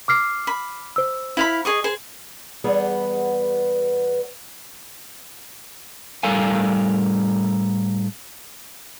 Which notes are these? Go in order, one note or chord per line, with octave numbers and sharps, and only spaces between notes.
D6 F6 C7
B5
C5 E6
E4 F5 B5
G#4 D#5 C#6
G#4 C5
E2 G3 B3 G#4 F#5
A2 G3 A4 A#4 F5 G#5